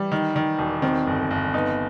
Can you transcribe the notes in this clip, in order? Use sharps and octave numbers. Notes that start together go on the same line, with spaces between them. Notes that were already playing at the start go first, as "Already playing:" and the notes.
Already playing: E3 G3
D#3
D#3
E1
D#3 C4
G1
G1
B3 D#4